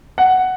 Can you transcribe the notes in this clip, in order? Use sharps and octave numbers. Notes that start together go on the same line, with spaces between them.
F#5